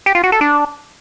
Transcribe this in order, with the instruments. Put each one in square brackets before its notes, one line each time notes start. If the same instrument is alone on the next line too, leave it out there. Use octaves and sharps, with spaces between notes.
[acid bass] G4
F4
F#4
A4
D4